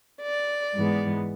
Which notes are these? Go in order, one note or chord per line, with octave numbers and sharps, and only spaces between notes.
D5
G#2 E3 G#3 B3